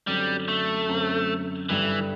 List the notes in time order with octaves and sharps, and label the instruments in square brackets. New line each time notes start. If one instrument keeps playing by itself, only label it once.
[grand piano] F#2 D3 F#3 C4 [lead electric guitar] G3
[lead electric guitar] A3
[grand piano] F#2 D3 F#3 C4
[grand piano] G2 D3 G3 [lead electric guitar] E3